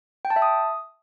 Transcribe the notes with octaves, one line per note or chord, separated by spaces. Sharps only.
G5
A5
E5
D#6